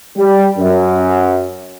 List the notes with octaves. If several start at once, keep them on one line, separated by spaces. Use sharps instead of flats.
G3
F#2